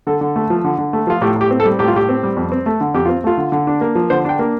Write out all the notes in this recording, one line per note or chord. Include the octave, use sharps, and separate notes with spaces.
D3 A4
D3
A3
F3
D3
D3
A3
F3 F4
A2 G4
A2 G4
C4
A4
G3
A2 G4
F4
A2 G4
C4
G3
F2
C4
A3
D3
F2 G4
C4 F4
A3 F4
D3
D3
D4
A#3
F3
D3 C5
D4 G5
A#3